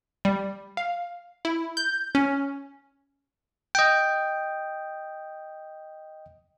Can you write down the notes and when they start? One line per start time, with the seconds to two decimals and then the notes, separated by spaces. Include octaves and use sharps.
0.25 G3
0.77 F5
1.45 E4
1.77 G6
2.15 C#4
3.75 D#5 G5